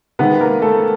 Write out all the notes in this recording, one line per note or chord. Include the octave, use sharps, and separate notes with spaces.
C3 D#3 G#3 B3 B4
A#3 A#4
A3 A4